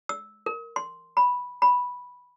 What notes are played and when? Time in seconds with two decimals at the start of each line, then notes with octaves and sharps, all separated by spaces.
0.09 E6
0.46 A#4
0.76 C6
1.17 B5
1.62 B5